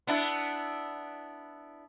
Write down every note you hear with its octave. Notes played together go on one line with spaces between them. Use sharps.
B3 D4 E4